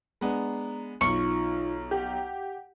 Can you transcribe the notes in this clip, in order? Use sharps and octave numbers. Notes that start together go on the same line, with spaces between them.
G#3 B3 D4 A#5
B1 D#4 F4 C#6
G4 F#5